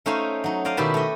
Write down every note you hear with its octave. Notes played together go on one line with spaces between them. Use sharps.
A3 C#4 D#4 C5 F5 G#5
F#3 D#4
C5 D5 D#5 F5
B2 D#3 E4 G4 B4 A5
A3 D#5